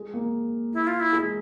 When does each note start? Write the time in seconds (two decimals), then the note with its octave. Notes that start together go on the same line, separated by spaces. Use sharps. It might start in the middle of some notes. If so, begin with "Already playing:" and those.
Already playing: G#3
0.14 A#3
0.73 E4
0.87 F4
1.00 E4
1.13 G#3